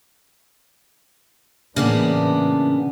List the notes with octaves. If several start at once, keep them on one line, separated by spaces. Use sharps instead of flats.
A2 C#3 E3 A#3 B3 D4